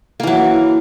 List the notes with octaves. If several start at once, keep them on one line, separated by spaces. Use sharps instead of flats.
E3 F#3 A#3